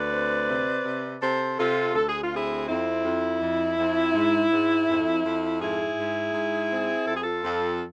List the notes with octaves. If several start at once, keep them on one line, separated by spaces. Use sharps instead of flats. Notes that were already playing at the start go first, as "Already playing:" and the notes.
Already playing: D2 B4 D5
C4
C3
C3
C3 A4 C5
C3 F4 A4
D2 A4
G#4
F4
C4 E4 G#4
F2 E4
F2
F2
F2
G#2
G#2
F2
F2
G#2 E4 G#4
G#2
G#2
C4
F2 A4
G#4
F4 A4
F2